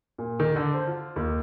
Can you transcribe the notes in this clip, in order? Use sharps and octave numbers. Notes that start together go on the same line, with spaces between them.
A#2
D#3
D3
C5
F4
D#2